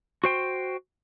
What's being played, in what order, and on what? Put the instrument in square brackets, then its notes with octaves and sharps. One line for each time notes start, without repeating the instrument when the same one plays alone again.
[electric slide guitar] F#4 C5 G5